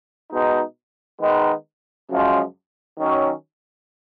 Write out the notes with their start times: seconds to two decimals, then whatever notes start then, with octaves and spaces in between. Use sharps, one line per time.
0.30 B2 G#3 D#4
1.19 D#3 G#3 B3 D#4
2.09 F#2 C#3 F3 G#3
2.98 D#3 F#3 C#4